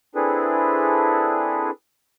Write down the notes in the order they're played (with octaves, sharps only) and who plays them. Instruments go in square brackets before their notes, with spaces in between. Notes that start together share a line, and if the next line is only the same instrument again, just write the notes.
[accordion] C4 D4 E4 G#4 A4 B4